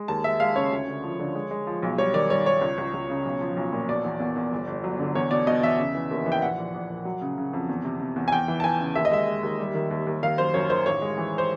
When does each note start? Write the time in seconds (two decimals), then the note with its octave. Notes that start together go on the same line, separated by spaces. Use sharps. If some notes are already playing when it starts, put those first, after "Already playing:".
Already playing: G#3
0.08 D#2 A5
0.24 G#3 E5
0.40 G#3 F5
0.55 C#3 C#5
0.71 D2
0.88 D3
1.04 F3
1.19 D3
1.35 G#3
1.51 G#3
1.67 F3
1.82 B1
1.98 G3 C#5
2.14 D#3 D5
2.30 G3 C#5
2.46 G3 C#5
2.61 C#2
2.78 C#2
2.94 C#2
3.09 C#3
3.25 B1
3.41 F3
3.56 B1
3.73 A#2
3.88 B2 D5
4.04 E2
4.20 E2
4.36 E2
4.52 G1
4.67 G1
4.84 F#3
4.99 D3
5.15 E2 C#5
5.31 B2 D5
5.47 B2 D#5
5.63 E2 E5
5.79 C#3
5.95 E3
6.11 D#2
6.26 E3
6.32 G5
6.42 A#1 F#5
6.58 A#1
6.74 A#1
6.90 A#1
7.05 F#3
7.22 C#3
7.38 C#3
7.53 F2
7.69 E2
7.85 C3
8.00 C3
8.16 E2
8.28 G#5
8.32 E2 G5
8.48 E3
8.60 A5
8.64 E3 G#5
8.80 C#3
8.95 D#2 E5
9.05 D#5
9.11 G#3 E5
9.27 G#3
9.43 D#2
9.59 G3
9.75 D#3
9.91 D#2
10.07 D#2
10.23 D#3 F5
10.38 F#2 C5
10.54 F#2 C#5
10.70 D#3 C5
10.86 A1 C#5
11.02 G#3
11.18 E3
11.38 C5